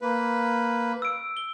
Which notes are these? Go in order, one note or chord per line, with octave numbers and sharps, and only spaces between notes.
A#3 B4
E6 D7
G7